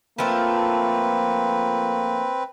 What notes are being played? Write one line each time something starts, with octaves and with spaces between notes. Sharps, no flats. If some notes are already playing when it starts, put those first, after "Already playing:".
F3 A3 A#3 C4 F4 B4